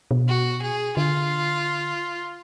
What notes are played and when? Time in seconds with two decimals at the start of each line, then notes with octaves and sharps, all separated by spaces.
0.11 B2
0.28 F#4
0.62 G#4
0.97 D3 F4